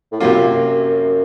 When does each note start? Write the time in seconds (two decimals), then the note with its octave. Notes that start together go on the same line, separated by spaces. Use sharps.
0.12 A2
0.20 F#2 C3 F#3 A#3 F4